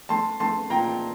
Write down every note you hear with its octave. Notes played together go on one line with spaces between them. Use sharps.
A3 A5 C6
A3 A5 C6
A#2 G5 A#5